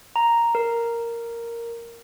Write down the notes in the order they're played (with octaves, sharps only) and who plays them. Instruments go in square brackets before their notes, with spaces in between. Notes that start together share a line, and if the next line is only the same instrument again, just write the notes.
[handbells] A#5
A#4